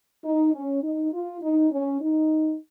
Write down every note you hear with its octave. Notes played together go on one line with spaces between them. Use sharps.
D#4
C#4
D#4
F4
D#4
C#4
D#4